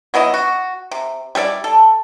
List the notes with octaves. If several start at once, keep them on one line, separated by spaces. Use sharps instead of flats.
F#3 B3 E4 D#5
F#4
C3
G3 E4 A4 D5
A4